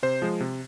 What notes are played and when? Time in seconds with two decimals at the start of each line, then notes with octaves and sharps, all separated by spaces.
0.03 C3 C5
0.22 F3 G#3
0.40 C3